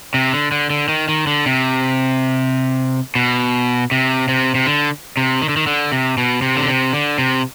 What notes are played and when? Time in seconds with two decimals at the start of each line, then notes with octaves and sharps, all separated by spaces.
0.14 C3
0.33 D3
0.52 D3
0.70 D3
0.89 D#3
1.09 D#3
1.27 D3
1.46 C3
3.15 B2
3.91 C3
4.28 C3
4.55 C3
4.66 D3
5.17 C3
5.42 D#3
5.49 D3
5.57 D#3
5.67 D3
5.92 C3
6.18 B2
6.42 C3
6.57 D3
6.68 C3
6.93 D3
7.18 C3